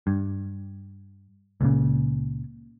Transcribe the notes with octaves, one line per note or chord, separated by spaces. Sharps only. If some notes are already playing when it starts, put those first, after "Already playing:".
G2
C#2 A#2 C#3